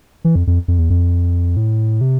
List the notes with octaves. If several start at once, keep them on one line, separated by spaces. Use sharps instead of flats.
E3
F2
F2
F2
E2
F2
A2
C3